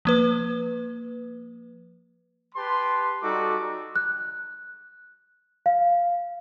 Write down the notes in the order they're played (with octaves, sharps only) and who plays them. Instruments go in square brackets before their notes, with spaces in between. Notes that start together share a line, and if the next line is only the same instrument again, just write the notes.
[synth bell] F3 A#3 B4
[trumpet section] G4 B4 A5 C6
G3 D#4 F#4 A4 D6
[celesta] F#6
F5